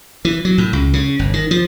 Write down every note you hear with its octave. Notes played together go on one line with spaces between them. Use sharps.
E3
F#3
A2
C#2
C#3
G1
D#3
F3